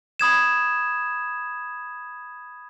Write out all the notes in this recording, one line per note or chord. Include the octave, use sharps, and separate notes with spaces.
B5 D#6 G#6 E7